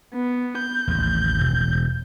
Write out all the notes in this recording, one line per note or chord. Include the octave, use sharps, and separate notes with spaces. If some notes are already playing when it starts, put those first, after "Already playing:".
B3
G6
A1 D#2
E1